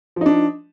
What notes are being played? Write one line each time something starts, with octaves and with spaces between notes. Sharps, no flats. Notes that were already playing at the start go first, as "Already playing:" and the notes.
F3 D4 D#4